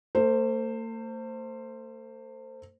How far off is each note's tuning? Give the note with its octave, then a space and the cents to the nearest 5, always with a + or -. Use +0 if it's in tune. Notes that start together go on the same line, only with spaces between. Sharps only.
A3 +45 C5 +0